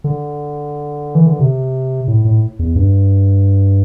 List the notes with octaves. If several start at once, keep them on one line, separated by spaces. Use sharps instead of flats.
D3
E3
D3
C3
A2
A2
E2
G2